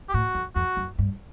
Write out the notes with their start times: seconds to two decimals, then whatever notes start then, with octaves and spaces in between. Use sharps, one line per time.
0.09 G4
0.14 A2 F#4
0.35 F2
0.56 F2 F#4
0.77 F#2
0.98 G2